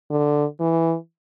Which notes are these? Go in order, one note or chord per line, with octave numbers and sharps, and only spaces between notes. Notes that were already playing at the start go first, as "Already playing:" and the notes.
D3
E3